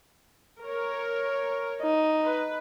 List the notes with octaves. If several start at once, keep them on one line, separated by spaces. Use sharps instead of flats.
A#4 C#5
D#4
B4